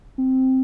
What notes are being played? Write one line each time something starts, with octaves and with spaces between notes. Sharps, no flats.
C4